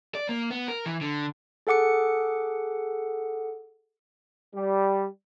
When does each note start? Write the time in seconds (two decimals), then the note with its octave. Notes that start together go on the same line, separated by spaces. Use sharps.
0.15 D5
0.29 A#3
0.51 B3
0.68 A#4
0.86 E3
1.01 D3
1.67 G#4 A4 F#5 D6 C#7
4.53 G3